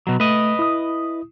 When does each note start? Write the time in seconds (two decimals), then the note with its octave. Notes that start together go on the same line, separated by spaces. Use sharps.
0.07 B2 F#3
0.20 A3 B4 D#5
0.59 E4 D#6